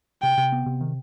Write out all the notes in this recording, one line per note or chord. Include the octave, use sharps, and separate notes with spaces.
C3 G5
C3
B3
C3
D#3